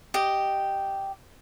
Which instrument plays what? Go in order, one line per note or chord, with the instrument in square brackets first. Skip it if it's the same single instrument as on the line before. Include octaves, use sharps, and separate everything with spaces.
[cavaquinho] G4 D#5